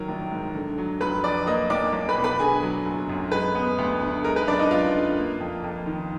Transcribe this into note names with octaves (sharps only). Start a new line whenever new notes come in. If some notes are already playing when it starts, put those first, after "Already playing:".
Already playing: D#3 F#3 A#4
A#1
G#2
D3
F#3
F1 B4 B5
F2 D5 D6
A#3 D#5 D#6
B1 D5 D6
B1
B4 B5
B2
B4 B5
D3 G#4 G#5
F#3
F#1
F#2
G#3 B4
B3
D2
D3
G#3 A#4
B4
F#2 D4 D5
D#4 D#5
F#2 F4 F5
D3
A#3
F2
F2
D#3